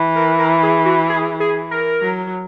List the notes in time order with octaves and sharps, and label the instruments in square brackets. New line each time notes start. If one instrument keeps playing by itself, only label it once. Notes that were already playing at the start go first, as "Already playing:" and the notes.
Already playing: [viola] E3
[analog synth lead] A#4
A#4
G#4
F#4
G#4
G#4
A#4
[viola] F#3